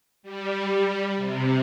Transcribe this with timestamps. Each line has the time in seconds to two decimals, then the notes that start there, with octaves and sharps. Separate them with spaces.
0.23 G3
1.16 C3